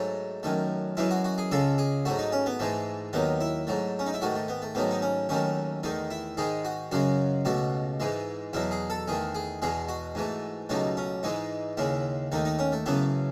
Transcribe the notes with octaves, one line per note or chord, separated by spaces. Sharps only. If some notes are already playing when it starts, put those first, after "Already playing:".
Already playing: G#2 F#3 A3
F#2 D#3 A3
F#2 E3 G#3 E4
F#4
F#4
G#4
C#2 C#3 G#3 A4
G#4
G#2 F#3 A3 F#4
D#4
C#4
B3
G#2 E3 G#3 A3
D#2 D#3 F#3 B3
E4
G#2 F#3 A3
C#4
D#4
E4
G#2 D#3 A3 F#4
A3
B3
A3
G#2 D#3 F#3 A3 B3
D#4
C#4
D#2 D#3 F#3 A3 C#4
E2 D#3 A3 D#4
E4
G#2 D#3 G#3 G#4
F#4
F#2 C#3 G#3 F#4
C#2 B2 A3 F#4
G#2 E3 G#3
E2 B2 F#3 E4
G#4
A4
E2 D#3 A3 G#4
G#4
E2 B2 G#3 G#4
F#4
G#2 E3 A3
C#2 B2 F#3 A3 D#4
C#4
G#2 E3 G#3 D#4
D#2 C#3 G#3 E4
D#2 D#3 A3 D#4
D#4
C#4
A3
F#2 C#3 E3 A3 B3